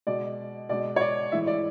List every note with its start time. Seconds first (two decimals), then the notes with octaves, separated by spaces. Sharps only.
0.07 B2 G#3 D5
0.69 B2 G#3 D5
0.96 C#5
1.01 D5
1.32 A2 E3 G#3 E5
1.47 D5